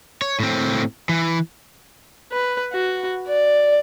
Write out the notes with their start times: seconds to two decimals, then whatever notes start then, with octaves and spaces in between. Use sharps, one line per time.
0.22 C#5
0.40 A2 C4
1.09 E3
2.32 B4
2.73 F#4
3.27 D5